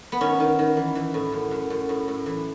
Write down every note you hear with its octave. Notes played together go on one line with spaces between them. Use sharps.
B3
D#3 C#4
D#3
D#3
E3
E3
A2
F#2
F#2
F#2
A2
A2
E3